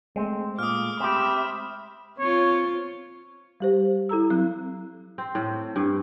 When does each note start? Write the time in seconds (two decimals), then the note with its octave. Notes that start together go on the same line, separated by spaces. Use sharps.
0.16 G#3 A3 C4
0.59 A#2 D6 D#6 F6
1.00 C4 G4 E5 B5
2.19 C4 F4 C#5
3.60 G3 G4 C5
4.09 E4 A4 A#5 E6
4.30 F#3 C4 F#6
5.18 C4
5.35 A2
5.76 G2